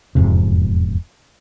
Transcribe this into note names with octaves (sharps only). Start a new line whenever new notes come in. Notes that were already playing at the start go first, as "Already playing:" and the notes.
E1 F2 G#2 C3